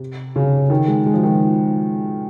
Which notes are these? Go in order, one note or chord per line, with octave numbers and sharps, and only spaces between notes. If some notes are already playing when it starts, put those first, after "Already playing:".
Already playing: C3
C#3
D#3
G#3
G#3
F3
D#3